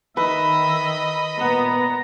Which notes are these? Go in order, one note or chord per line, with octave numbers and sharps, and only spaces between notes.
D#3 B4 D#5 E5 B5
A#2 B3 A#5